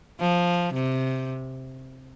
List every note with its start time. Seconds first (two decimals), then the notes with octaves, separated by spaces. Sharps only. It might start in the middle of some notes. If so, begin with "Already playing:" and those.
0.21 F3
0.74 C3